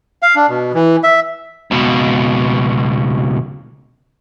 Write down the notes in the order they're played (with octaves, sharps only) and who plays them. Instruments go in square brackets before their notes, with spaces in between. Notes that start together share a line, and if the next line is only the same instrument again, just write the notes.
[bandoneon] F5
D4
B2
E3
E5
[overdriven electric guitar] C#2 B2